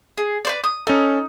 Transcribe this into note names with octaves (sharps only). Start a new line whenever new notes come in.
G#4
B4 C5 D5
D#6
C#4 D#4 A4